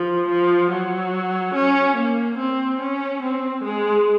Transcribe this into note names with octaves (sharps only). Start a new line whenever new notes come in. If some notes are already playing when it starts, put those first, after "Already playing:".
Already playing: F3
F3
F#3
C#4
A#3
C4
C#4
C4
G#3